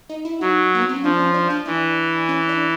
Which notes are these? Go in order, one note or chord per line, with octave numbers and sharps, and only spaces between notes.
D#4
E4
F#3 D#4
A#3
B3
C4
C#4
F3 D4
C#4
D4
D4
E3 D4
C#4
D4